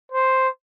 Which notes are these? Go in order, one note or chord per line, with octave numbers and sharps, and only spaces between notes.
C5